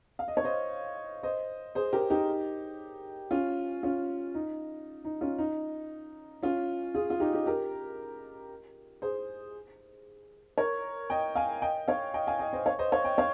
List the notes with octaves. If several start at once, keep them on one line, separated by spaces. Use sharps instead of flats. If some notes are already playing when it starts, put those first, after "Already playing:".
F5
D#5
C#5
C5 D#5
C5 D#5
G#4 C5
G4 A#4
D#4 G4
C#4 F4
C#4 F4
D#4
D#4
C#4 F4
D#4
C#4 F4
F4 G#4
F4
D#4 G4
D#4 G4
G4 A#4
G#4 C5
A#4 C#5
D#5 G5
F5 G#5
D#5 G5
C#5 F5
D#5 G5
F5 G#5
D#5 G5
C5 D#5
C#5 F5
C5 D#5
C#5 F5
D#5 G5
C#5 F5